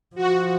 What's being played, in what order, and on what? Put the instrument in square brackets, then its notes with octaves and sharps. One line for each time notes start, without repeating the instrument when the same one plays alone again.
[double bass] F3 [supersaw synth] F#4